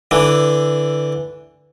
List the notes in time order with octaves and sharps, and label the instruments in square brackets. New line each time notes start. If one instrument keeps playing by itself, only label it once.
[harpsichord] D3 E3